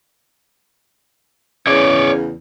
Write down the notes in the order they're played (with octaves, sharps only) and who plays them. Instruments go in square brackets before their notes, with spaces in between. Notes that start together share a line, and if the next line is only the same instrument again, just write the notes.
[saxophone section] E2 C#3 C#4 [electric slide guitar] C#5 D5